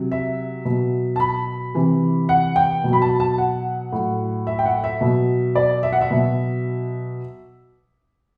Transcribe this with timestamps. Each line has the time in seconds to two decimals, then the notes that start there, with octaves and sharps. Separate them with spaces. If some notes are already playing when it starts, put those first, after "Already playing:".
Already playing: C3 F#3
0.12 E5
0.65 B2 F#3
1.16 A5
1.20 B5
1.74 C3 E3
2.29 F#5
2.56 G5
2.84 B2 F#3
2.93 B5
3.02 A5
3.20 A5
3.38 F#5
3.92 A2 F#3
4.47 E5
4.59 G5
4.66 F#5
4.84 E5
5.01 B2 F#3
5.55 D5
5.83 E5
5.93 F#5
6.01 E5
6.11 B2 F#3